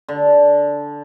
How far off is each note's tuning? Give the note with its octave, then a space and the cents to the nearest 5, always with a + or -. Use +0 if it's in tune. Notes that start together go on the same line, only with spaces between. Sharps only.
D3 -10